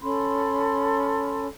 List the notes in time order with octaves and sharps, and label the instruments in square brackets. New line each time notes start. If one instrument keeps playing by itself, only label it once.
[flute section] C#4 A4 B5 C6